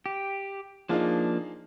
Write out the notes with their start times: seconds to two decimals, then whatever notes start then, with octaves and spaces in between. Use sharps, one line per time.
0.06 G4
0.89 F3 A#3 D4 D#4 F4 G#4